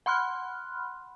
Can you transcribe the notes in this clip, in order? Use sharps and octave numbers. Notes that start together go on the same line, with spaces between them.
F#5 B5 C6 F6 F#6